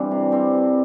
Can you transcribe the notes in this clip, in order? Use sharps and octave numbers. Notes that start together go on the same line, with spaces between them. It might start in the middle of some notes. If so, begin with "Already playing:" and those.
Already playing: G2 E3 G3 C4 D4
C3
G3 C4